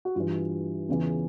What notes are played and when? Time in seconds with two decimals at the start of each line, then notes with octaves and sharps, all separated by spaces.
0.05 F#4
0.15 G2 E3 F4
0.88 E2 C#3 E3